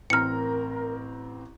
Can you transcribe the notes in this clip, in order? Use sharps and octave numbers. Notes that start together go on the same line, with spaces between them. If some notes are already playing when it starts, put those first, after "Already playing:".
A1 C4 A#4 A#5 F6 C#7